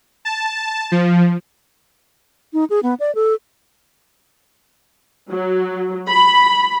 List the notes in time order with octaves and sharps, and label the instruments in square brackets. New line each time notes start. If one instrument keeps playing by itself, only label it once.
[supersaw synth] A5
F3
[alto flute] D#4
G#4
B3
D5
A4
[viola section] F#3
B5